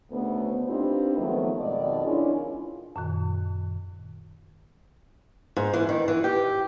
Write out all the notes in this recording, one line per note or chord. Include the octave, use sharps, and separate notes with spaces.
D2 C#3 A3 B3
C4 D4 D#4 F4 G4 B4
D#3 F3 F#3 G#3 A3 B3
F2 G#2 B2 D#3 D5 D#5
C#4 D4 E4 F4 G#4 A#4
F#2 A#2 D#3
G#2
E3
D#3
E3
G4